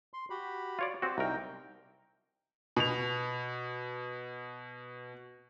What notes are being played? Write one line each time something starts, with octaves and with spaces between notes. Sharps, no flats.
C6
F#4 G4 B5
F4 C#5 D5
C4 F#4 G4
C2 D#4 A#4 G5
B2 F7